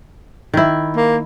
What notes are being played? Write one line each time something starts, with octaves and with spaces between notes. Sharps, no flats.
D#3 E4
A#3